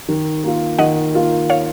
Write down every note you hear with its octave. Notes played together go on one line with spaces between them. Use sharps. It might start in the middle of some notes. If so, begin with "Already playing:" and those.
D#3
A#3 F4
D#3 D#5 F#5
A#3 F4
C#5 F5